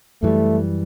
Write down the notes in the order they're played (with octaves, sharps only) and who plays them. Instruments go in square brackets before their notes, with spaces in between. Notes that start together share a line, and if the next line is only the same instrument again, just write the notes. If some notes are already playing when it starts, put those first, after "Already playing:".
[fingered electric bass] F#2 E3 G3 [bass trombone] A3